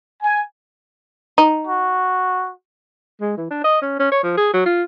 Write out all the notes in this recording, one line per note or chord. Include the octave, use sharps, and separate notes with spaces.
G#5
D#4
F#4
G#3
E3
D4
D#5
C#4
C#4
C#5
F3
G#4
F#3
F4